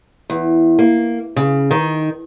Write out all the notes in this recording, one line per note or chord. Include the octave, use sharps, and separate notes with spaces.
E2
A#3
C#3
D#3